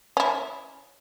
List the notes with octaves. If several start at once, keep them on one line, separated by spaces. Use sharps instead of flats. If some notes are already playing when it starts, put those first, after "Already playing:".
C#4 E4